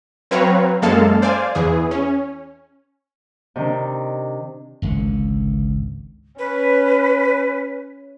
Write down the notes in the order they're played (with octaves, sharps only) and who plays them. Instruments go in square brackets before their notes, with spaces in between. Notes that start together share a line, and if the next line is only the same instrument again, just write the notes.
[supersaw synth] F#3 C4 B4 C#5 F5 A#5
F#2 G#3 A#3 A4 F5 A5
C5 D5 F5 G#5
E2 E3 G#4
C#4
[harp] C3 D#3 D4
[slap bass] G#1 C#2 D3
[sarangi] C#4 [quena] B4